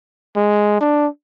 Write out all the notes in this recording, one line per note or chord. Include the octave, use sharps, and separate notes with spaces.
G#3
D4